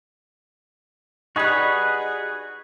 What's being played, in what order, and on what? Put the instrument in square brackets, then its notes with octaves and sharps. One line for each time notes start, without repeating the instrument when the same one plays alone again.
[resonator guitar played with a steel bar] G3 D#4 [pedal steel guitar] F#4 G#4 B4